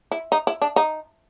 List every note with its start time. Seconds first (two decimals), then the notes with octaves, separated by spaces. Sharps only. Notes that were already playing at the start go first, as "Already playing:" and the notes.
0.11 E4
0.32 D#4
0.47 E4
0.62 D4
0.76 D#4